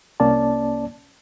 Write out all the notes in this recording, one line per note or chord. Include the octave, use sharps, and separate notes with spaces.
C2 A#3 C#4 D5 A5